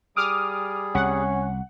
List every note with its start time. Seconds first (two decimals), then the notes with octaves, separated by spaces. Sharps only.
0.16 G3 G#4 D6 D#6 F6
0.95 C2 C#4 F#5